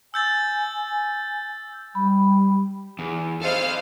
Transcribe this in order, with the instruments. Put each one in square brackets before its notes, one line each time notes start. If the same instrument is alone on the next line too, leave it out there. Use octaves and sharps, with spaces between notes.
[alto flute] G#5 [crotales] E6 G6 A6
[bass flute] G3 [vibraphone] B5
[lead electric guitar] E2
[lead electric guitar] A4 D#5 [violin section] C5 F5 F6